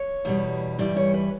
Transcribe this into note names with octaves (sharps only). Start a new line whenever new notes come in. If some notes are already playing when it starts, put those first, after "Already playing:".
Already playing: C#5
E2 B2 G3
G2 E3 G3 D5
C#5
B4